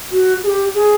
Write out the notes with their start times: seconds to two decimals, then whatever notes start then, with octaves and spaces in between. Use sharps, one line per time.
0.12 F#4
0.43 G#4
0.47 G4
0.74 G#4